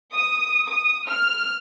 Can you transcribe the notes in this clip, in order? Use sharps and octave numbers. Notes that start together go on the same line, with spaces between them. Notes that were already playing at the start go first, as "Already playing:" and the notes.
D#6
D#6
F6